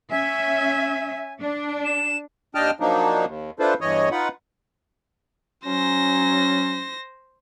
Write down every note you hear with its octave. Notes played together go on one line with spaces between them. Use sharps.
C#4 E5 G#5
D4
E7
D#2 D4 D#5 G5 A5 F6
F3 F#3 A#3 D4 D#4
D#2
D4 E4 F4 A4 B4 C5
E2 G2 E3 C#5 D#5
D#4 F4 B4 F#5
F#3 C#4 C5 A#6